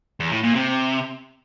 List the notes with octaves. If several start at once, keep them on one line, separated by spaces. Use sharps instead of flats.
E2
A2
A#2
C3